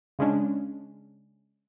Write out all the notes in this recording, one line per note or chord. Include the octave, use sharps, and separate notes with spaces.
C#3 G#3 C#4 D4